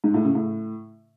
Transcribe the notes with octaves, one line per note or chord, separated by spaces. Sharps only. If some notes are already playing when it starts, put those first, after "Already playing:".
G#2
A2
C#3
A2